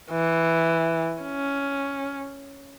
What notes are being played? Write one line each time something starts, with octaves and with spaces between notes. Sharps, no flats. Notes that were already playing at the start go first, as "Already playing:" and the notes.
E3
C#4